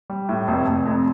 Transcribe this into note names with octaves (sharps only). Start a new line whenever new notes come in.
G3
A2
F1
F1
F2